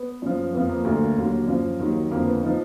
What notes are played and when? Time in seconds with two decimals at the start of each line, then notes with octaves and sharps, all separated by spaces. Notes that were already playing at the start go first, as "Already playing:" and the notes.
Already playing: B3
0.22 F#2 F3
0.53 F2 F3 B3
0.69 A#3
0.84 D2 D3 F#3 A#3
1.17 D#2 D3 F#3
1.48 F#2 F3
1.79 D#2 D#3 F#3
2.11 F2 D3 F3 A#3
2.27 B3
2.42 F3 D#4